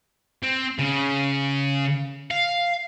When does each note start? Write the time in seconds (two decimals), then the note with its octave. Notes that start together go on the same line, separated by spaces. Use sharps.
0.43 C4
0.79 C#3
2.31 F5